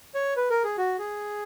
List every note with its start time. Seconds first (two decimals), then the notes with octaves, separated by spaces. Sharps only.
0.15 C#5
0.36 B4
0.50 A#4
0.64 G#4
0.78 F#4
0.99 G#4